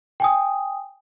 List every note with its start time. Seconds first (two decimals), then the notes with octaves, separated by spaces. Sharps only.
0.20 G5 G#5 D#6